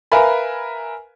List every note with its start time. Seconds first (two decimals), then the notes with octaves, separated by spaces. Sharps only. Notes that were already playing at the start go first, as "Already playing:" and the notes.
0.12 A#4 B4 E5 F5 G#5 B5